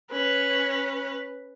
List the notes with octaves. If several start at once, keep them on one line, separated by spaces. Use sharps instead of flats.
C#4 B4